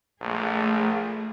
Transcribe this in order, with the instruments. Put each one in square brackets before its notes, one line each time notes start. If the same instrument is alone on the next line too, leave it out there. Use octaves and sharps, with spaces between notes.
[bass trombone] A#1 [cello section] A3 G#4